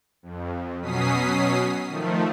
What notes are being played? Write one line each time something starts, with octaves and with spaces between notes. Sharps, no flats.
F2
B2 F#3 C#4 D#6 B6 C7
D#3 F3 A3